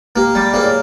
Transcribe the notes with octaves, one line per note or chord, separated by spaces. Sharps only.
A#3 G4
G3
A#3 G#4 C5
C#5